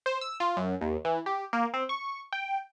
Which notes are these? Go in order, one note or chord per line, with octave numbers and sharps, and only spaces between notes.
C5
E6
F4
F#2
D#2
E3
G4
A#3
C4
C#6
G5